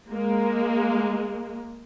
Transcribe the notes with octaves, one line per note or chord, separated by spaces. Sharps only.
G#3 A#3